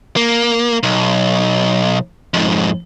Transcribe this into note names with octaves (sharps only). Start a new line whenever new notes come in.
A#3
B1
F2 G#2